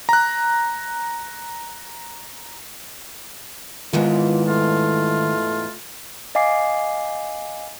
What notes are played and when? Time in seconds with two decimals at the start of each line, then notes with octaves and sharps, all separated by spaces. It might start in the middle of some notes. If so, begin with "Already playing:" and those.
0.09 A#5 F#6
3.93 E2 G#2 D#3 E3 G#3 F4
4.47 A3 F4
6.35 D#5 F5 G#5 D6 C7